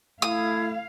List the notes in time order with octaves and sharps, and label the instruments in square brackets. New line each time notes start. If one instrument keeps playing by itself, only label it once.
[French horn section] A3 [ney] E4 [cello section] F5 [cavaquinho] D#6